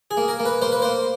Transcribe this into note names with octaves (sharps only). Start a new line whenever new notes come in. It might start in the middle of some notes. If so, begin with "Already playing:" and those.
G#4
A#3
A#4
A#3
B4
A#3 C5
B4
A#3 C5